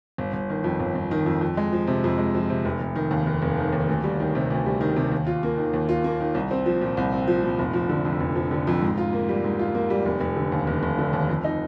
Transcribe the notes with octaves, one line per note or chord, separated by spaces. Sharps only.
G1
G1
D#3
F2
G1
G1
D#3
F2
F2
G#3
F3
C3
F2
G#3
F3
C3
F1
F1
D#3
D#2
F1
F1
D#3
D#2
D2
G3
D#3
C3
D2
G3
D#3
C3
D#2
F4
A#3
D#3
D#2
F4
A#3
D#3
C2
C4
F3
A#2
C2
C4
F3
A#2
F1
F3
D3
F2
F1
F3
D3
F2
G#2
F4
A#3
G3
G#2
F4
A#3
G3
F1
F1
D3
D#2
F1
F1
D3
D#2
F2
D#4